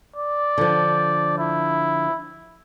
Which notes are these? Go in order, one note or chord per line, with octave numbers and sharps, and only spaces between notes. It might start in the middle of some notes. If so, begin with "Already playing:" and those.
D5
D3 F3
E4